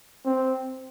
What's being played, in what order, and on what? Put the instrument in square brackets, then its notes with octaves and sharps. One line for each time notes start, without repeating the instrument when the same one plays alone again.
[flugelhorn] C4